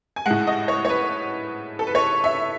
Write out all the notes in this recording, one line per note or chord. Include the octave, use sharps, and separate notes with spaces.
G#5
A2 G#3 F#5
D#5
C#5
C#5
B4
A4
B4
C#5
E5